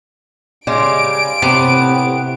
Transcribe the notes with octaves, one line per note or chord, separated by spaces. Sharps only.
C#3 G3 G#3 D7
A2 C3 B3